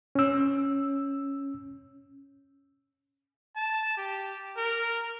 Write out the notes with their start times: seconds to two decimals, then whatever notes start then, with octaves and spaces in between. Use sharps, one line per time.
0.15 C#4 E6
3.57 A5
3.98 G4
4.58 A#4